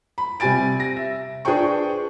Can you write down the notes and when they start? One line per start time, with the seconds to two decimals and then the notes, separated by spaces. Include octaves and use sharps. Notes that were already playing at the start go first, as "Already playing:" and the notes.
0.18 B5
0.40 C3 G3 G4 G#5 A6 D7
0.80 A#6
0.96 E5
1.45 D4 G#4 B4 C5 G5 C#6